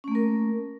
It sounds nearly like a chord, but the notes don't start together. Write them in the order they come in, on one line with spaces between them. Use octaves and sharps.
C#4 A3 A#3 A#4